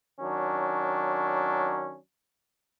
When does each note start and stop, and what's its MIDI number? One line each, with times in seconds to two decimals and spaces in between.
0.21 1.97 51
0.21 1.97 54
0.21 1.97 61
0.21 1.97 62